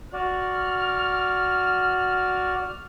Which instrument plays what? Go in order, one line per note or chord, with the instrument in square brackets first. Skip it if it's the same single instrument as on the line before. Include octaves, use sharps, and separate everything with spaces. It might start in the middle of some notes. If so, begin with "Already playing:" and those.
[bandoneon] F#4 D5 [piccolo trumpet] F6